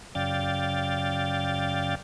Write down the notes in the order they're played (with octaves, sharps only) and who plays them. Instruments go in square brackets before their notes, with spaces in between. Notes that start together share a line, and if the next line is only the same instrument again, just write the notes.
[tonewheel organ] F#2 C#3 D5 F5 G5 A6